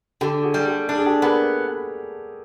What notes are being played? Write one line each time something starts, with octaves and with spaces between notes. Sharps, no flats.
D3 G4 A4
F#4 G#4
G3
G4 A4
D4 A4
G#4
G4 A4
B3 G#4 A#4